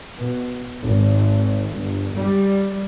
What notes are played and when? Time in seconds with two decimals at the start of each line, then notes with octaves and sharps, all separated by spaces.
0.17 B2
0.85 G#1
1.77 G1
2.15 G3